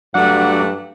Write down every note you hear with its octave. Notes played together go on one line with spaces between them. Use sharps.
G2 F#3 A3 D4 F#5